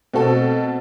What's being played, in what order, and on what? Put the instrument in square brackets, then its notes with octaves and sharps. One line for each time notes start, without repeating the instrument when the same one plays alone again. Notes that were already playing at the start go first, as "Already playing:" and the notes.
[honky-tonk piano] B2 A4 [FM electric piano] A3 C4 F#4